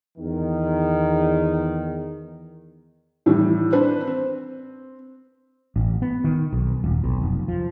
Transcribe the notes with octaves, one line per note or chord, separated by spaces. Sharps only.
E2 D#3
A2 D#3 E3 G3
C4 D4 B4 C5
C4
A1
B3
D#3
B1
D#1
B1
F1
F3